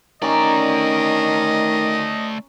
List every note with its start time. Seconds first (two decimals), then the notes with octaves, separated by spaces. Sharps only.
0.22 D#3 A3 C#4 D5 D#5 A#5